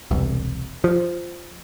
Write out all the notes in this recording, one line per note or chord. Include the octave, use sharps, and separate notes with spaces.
E1 C2
F3